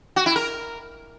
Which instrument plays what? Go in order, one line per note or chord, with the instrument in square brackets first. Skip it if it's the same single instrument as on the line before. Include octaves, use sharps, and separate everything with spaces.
[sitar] F#4
E4
A#4